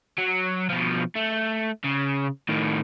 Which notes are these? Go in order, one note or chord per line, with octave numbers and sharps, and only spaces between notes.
F#3
B2 F3
A3
C#3
A2 D#3